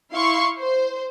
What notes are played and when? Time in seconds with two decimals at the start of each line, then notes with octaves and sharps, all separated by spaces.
0.12 E4 F5 C6 C#6
0.58 C5